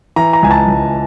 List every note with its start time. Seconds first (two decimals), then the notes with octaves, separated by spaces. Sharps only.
0.16 E3 A#5
0.33 A#5
0.43 C#2 G#5
0.51 A5
0.68 C#2